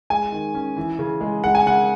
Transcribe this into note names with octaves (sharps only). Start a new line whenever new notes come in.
G#3 G#5
D#3
C#4
E3
C#3
G#3
G#3 F#5
G#5
C#3 F#5